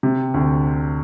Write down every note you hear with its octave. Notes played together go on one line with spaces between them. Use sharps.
C3
D2